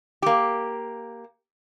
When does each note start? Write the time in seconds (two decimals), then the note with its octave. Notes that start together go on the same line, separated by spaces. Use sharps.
0.22 A#3 G4